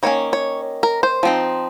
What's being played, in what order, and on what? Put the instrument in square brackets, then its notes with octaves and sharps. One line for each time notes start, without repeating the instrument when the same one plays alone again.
[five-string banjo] D#3 A#3 C#4 C#5
C#5
A#4
C5
F3 C4 D#4